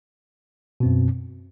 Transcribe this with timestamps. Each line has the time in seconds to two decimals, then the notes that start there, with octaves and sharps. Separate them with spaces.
0.80 B2
0.83 C4
0.86 F#2